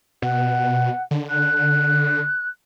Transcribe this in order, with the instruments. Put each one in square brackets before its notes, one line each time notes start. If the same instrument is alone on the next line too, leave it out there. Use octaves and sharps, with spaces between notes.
[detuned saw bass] B2 [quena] F#5
[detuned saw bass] D3
[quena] F#6